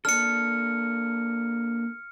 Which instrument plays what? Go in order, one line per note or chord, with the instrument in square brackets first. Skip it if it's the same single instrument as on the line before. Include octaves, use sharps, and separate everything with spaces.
[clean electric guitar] A#3 D4 A4 [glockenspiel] F6 C#7